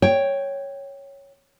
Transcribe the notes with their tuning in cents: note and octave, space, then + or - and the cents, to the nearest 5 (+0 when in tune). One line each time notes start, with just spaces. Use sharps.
C#5 +0 G5 +0